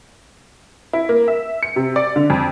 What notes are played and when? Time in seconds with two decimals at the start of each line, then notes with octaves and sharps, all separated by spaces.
0.93 E4
1.09 A#3
1.28 E5
1.63 C#7
1.76 C3
1.96 D5
2.16 D3
2.30 F2